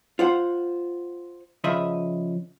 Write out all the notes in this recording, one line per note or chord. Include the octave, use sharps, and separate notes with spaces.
F4 C5 F#5
C#3 F3 D#5 E5 B5